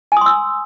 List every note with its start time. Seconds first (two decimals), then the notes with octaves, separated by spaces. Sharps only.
0.12 G#5
0.17 D#6
0.21 C6
0.26 E6